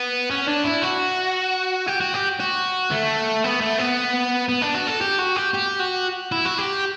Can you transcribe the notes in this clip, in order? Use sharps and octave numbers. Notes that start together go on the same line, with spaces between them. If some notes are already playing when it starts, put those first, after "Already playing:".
Already playing: B3
C#4
D4
E4
F#4
G4
F#4
G4
F#4
A3
B3
A3
B3
B3
D4
F#4
A4
G4
F#4
G4
G4
F#4
E4
F#4
G4